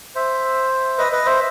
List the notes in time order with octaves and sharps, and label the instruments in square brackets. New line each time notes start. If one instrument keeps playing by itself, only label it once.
[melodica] C5 E5
B4 D#5
B4 D#5
C5 E5